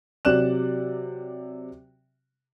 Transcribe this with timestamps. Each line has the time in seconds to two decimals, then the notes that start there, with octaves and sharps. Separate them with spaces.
0.25 C3 F#3 D5 F#6 E7